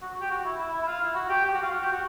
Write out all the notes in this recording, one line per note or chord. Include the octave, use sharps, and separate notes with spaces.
F#4
G4
F#4
E4
E4
E4
E4
F4
E4
F#4
G4
G4
F#4
F4
F#4
G4
F#4